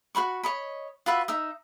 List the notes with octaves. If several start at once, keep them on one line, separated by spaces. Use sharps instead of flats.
F#4 C5 B5 C#6
C#5 D#5 B5
F4 F#4 B4 E5
D#4 E5 D#6